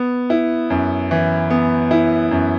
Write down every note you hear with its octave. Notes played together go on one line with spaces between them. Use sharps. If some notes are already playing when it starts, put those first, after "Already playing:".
Already playing: B3
E4
F#2
E3
B3
E4
F#2